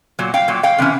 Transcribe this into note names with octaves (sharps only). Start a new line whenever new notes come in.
A#2 F#3
F5 G5
A#2 F#3
F5 G5
C3 E3 C#4